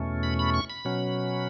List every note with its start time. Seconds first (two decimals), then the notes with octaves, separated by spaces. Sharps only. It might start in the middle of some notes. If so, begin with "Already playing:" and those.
Already playing: E2 B2 A3 C#4
0.23 B5
0.39 B5
0.54 C#6
0.70 B5
0.85 B2 F#3 C#4